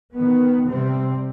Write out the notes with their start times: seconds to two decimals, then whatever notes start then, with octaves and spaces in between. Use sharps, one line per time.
0.14 D#3 B3
0.69 C3 G3 C4